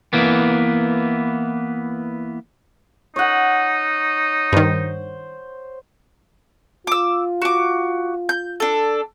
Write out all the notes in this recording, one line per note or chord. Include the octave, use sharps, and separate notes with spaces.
E3 A#3 B3
D#4 C#5 F#5
G2 D#3 C5
F4 D6 E6
F#4 D6
G6
D4 A4